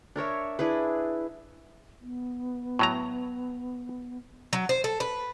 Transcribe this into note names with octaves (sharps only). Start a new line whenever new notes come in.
D4 A#4 C#5 E5
D4 E4 G#4 B4
B3
A2 F#3 A#5
F#3
C5
A4
B4